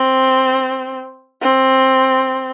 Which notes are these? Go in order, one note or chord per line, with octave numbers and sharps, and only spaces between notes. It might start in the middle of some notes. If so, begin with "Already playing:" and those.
Already playing: C4
C4